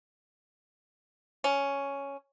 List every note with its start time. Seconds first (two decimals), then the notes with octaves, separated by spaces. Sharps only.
1.44 C#4